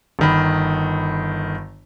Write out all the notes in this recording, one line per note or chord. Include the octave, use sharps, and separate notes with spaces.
G1 D#3 B5